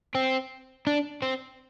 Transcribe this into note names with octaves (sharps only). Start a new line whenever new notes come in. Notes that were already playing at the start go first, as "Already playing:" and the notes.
C4
D4
C4